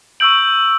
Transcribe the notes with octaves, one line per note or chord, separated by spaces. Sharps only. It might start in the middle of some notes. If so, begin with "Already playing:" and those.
C#6 E6 G6 D7 F#7